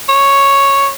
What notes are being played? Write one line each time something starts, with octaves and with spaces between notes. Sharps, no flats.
C#5